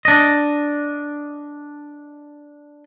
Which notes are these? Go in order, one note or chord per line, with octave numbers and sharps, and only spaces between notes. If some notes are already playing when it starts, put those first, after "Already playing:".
D4 D#5